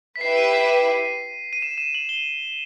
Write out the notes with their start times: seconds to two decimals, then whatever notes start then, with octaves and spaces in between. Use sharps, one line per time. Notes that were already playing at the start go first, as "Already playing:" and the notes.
0.16 B6
0.21 E4 G4 B4 E5 C7
0.37 D#7
0.53 C7
0.68 D#7
1.53 D#7
1.62 E7
1.78 E7
1.95 F#7
2.09 G7